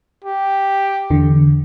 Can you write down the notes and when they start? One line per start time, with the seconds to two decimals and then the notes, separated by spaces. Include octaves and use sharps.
0.24 G4
1.10 E2 D3